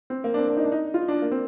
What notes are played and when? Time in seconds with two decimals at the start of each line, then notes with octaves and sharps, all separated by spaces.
0.10 C4
0.24 A#3
0.34 D4
0.38 C4
0.48 D4
0.57 D#4
0.64 D4
0.72 D#4
0.94 F4
1.08 D4
1.22 A#3
1.31 C4